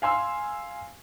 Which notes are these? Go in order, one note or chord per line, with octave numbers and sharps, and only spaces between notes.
F5 G#5 C6 E6